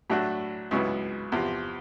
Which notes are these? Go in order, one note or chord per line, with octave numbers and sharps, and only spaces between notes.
A2 F#3 A3 D4 F#4
C#2 C#3 F#3 B3 E4
E2 C3 F3